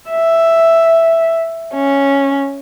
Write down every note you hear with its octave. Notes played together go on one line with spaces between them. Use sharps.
E5
C#4